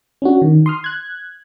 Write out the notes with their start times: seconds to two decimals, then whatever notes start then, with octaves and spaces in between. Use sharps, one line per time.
0.22 C#4 D4 F#4
0.42 D#3
0.66 C6 D#6 F6
0.84 F#6 G#6